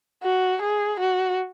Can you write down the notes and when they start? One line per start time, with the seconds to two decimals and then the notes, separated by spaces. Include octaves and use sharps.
0.24 F#4
0.62 G#4
1.00 F#4